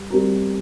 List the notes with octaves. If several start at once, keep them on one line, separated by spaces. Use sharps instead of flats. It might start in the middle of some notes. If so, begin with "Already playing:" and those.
Already playing: G3
G3 C4 G4 A#4